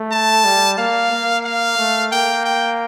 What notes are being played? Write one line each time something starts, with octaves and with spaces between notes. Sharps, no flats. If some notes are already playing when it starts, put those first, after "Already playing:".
Already playing: A3
A5
G3
A#3 F5
A#3
F5
A3
A#3 G5
G5